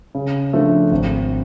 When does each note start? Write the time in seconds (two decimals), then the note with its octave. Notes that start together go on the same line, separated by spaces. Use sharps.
0.15 C#3
0.53 F3 A3 D4
0.91 G#1